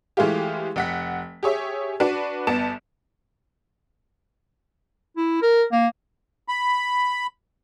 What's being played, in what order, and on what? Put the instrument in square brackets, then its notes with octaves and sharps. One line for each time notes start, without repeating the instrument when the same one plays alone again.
[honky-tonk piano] E3 G#3 A3 F4 G4
F1 F#5 B6
G4 G#4 C#5 E5
D4 F#4 B4
G1 B3 A5 D7 E7
[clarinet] E4
A#4
A#3
[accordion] B5